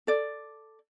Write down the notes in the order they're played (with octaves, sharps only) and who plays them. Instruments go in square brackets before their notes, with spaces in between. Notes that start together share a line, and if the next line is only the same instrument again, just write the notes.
[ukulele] A4 D5